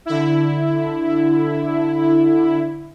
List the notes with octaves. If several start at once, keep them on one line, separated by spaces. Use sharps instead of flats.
D3 E4